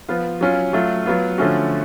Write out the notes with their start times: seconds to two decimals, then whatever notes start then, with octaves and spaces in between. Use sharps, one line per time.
0.09 F3 B3 F4
0.41 F#3 C#4 F4
0.73 F#3 A3 F4
1.06 F#3 B3 F4
1.38 D3 F3 A3 C#4 F#4